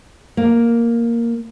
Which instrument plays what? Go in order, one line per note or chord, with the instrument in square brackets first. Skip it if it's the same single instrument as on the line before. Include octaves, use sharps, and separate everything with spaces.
[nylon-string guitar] A#3